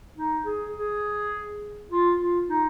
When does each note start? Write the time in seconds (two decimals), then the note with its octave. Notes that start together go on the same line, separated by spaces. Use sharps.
0.17 D#4
0.45 G#4
0.74 G#4
1.91 F4
2.20 F4
2.49 D#4